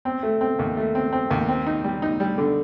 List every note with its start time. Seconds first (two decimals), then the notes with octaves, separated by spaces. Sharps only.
0.05 C4
0.23 A3
0.41 C4
0.59 D#2
0.77 A3
0.95 C4
1.13 C4
1.31 D#2
1.49 C4
1.66 D#4
1.84 G3
2.02 D#4
2.20 G3
2.38 D3